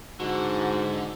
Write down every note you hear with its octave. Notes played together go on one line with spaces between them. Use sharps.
G#2 D3 F#4